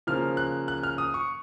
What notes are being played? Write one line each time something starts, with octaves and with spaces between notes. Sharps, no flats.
C#3 F3 A#3 F6
F#6
F#6
F6
D#6
C#6